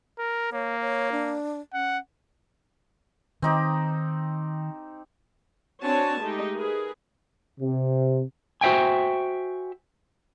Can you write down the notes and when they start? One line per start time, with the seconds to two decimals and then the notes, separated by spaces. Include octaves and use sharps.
0.18 A#4
0.52 A#3 C#5
0.81 C#5
1.12 D4
1.73 C#4 F#5
3.42 D#3 C4 D#4 G4
5.82 C4 D4 F#4 C#5 G#5 A5
6.20 G#3 A3 D#4 G4
6.55 G#4 A#4 B4
7.60 C3
8.61 F#4 C5 E5 G5 G#5